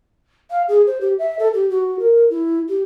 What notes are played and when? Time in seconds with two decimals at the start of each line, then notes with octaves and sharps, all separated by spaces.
0.51 F5
0.68 G#4
0.87 C5
1.01 G4
1.19 E5
1.39 A4
1.54 G4
1.70 F#4
1.99 A#4
2.30 E4
2.69 G4